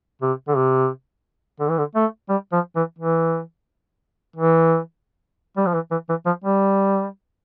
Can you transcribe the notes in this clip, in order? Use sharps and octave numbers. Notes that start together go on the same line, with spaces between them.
C3
D3
C3
D3
E3
D3
A3
G3
F3
E3
E3
E3
G3
F3
E3
E3
E3
F3
G3